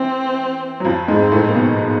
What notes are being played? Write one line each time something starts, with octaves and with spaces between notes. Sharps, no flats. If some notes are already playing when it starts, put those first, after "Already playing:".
Already playing: E3 C4
F#3
F2 F3
G#2 G#3
C4
A2 A3
A#3
B2 B3